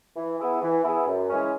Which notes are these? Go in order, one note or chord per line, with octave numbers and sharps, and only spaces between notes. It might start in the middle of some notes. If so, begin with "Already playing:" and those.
E3
B3 E4 G#4
E3
B3 E4 G#4
F#2
C#3 E3 G#3 C#4